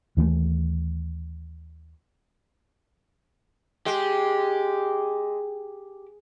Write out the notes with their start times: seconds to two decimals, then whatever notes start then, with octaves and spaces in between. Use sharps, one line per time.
0.17 D#2 E3 F3 A3
3.86 G#3 G4